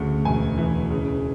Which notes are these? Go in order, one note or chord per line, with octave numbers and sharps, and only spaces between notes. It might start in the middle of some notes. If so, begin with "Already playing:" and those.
Already playing: D2 C#3
E1 G#5
E3
C#3